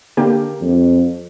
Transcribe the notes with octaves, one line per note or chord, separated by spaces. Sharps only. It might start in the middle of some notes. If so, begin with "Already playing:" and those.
D3 A#3 G4
F2